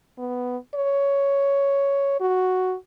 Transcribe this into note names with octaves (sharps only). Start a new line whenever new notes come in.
B3
C#5
F#4